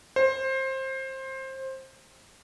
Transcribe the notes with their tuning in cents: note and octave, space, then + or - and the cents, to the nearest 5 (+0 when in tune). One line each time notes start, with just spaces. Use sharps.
C5 +20